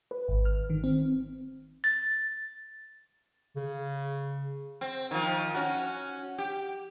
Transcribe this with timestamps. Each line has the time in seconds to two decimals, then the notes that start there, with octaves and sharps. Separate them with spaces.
0.11 B4
0.28 G#1
0.45 F6
0.70 D#3
0.84 C4
1.84 A6
3.56 C#3
4.81 C4
5.11 D#3 F3
5.54 C#4 F#4
6.38 G4